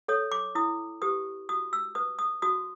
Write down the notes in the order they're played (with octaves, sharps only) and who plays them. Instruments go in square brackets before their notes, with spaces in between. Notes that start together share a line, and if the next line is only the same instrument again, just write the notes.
[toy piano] A4 C#5 D#6
D6
E4 D#6
G4 B4 D#6
F#4 D#6
E6
B4 D#6
D#6
F#4 D#6